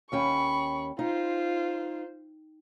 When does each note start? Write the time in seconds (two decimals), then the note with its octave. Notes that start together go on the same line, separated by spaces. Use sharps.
0.12 D#2 C#4 G5 B5 C#6
0.99 D#4 F4 C5